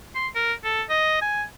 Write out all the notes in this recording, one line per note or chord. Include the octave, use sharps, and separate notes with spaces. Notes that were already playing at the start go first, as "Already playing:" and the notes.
C6
A#4
A4
D#5
G#5